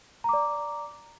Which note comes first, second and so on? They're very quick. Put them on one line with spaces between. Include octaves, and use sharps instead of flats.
A#5 D6 D5